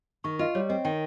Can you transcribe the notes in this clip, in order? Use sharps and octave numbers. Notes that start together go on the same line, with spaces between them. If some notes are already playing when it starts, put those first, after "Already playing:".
D#3 C#6
F4 D#5
G3 C#5
C4 D#5
D#3 G5